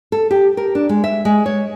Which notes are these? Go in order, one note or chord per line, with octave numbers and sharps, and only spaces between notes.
A4
G4
A#4
D4
G#3
E5
G#3
C#5